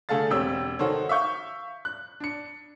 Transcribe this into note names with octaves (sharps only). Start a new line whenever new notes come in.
D3 A3 G#4 A4 F5 A6
E1 C4 G4 C#5 E6
D#3 F#4 A4 C5 C#5
E5 F5 C#6 G6
F#6
D4 C#7